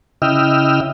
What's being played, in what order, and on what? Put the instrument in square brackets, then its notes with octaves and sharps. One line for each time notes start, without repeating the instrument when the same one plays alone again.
[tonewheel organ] C#3 E4 D#5 G5 E6 F6